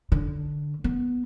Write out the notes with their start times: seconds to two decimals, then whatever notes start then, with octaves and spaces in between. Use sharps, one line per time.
0.12 D3
0.84 B3